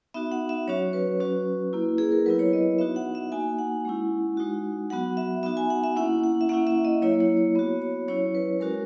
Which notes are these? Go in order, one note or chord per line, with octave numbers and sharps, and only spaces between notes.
B3 D#4 F#4 E5
F#5
E5
F#3 C#4 F#4 C#5
B4
F#3 C#4 F#4
A#3 E4
G#4
A#4
F#3 B3 E4 B4
C#5
D#5
B3 D#4 F#4 E5
F#5
E5
A#3 D#4 F#4 G#5
F#5
G#3 C#4 E4
G#3 D#4 F#4
F#3 B3 F#4 F#5
E5
B3 D#4 F#4 E5
G#5
F#5
E5
A#3 C#4 E4 F#5
F#5
E5
A#3 C#4 E4 F#5
E5
D#5
F#3 A#3 E4 C#5
C#5
C#5
B3 F#4 C#5
C#5
F#3 C#4 E4 C#5
B4
G#3 C#4 F#4 A#4